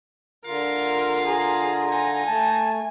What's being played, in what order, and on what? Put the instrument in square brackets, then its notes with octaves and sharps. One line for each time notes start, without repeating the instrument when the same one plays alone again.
[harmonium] D3 F4 [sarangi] A#4 [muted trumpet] F5
[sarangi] G#4 [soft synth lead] A#5
[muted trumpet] D#4 [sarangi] G#5
[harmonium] A3 [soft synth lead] A5